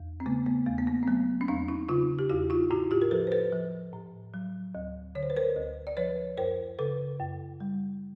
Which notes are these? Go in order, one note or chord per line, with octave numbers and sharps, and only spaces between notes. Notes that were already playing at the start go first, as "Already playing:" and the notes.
Already playing: E2
C4
C#3 A3 B3
A3 B3
E2 A3
B3
A#3
C4
F#3 A3 B3
C#4
E2 C4 D4
C#4 D#4
C#3 D#4 F4
G4
E2 E4 F#4
D#4 F4
A2 E4 F#4
F4 G4
A#4
F3 A4 B4
C5
A4 B4
F3
A2
F#3
D2
D3 C#5
C5
B4
A#4 C5
D2
D5
F3 B4 C#5
F#2 A#4 C5
C#3 A4 B4
F#2
G3